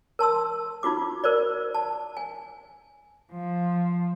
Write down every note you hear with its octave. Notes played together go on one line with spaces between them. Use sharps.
A#4 A5 C6 E6
D#4 F4 F#4 D6
A#4 C5 D5
A5
G#5
F3